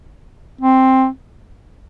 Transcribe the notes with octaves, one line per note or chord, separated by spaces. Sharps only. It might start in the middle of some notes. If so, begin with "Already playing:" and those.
C4